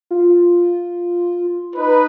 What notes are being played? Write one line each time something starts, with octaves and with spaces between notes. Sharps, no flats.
F4
D#4 B4